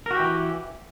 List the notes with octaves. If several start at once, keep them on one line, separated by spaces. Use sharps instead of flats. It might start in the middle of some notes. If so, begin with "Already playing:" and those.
E3 F#4 G4 A#4